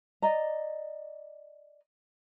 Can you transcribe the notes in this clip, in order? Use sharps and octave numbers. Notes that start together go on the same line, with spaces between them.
D5 D#5 A#5